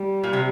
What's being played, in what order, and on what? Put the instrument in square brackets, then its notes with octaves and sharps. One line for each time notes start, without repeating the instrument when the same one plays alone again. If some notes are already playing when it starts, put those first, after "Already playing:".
Already playing: [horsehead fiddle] G3
[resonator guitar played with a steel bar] A#2
C3